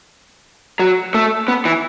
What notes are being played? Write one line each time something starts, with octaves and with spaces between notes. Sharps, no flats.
F#3
A3
B3
E3